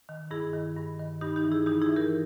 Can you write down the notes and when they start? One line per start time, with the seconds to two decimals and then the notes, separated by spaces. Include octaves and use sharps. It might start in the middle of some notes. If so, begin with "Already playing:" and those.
0.09 D#3
0.31 G2 E4 G#4
0.53 D#3
0.76 G2
1.00 D#3
1.21 G2 D#4 G4
1.36 D#4 G4
1.45 E3
1.52 E4 G#4
1.66 G2 D#4 G4
1.82 E4 G#4
1.89 E3
1.96 G4 A#4